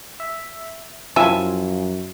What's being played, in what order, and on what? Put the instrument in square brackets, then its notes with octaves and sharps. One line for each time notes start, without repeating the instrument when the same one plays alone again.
[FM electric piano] E5
[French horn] F#2 [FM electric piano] F3 F4 [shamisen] E4 E5 [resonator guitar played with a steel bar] G#5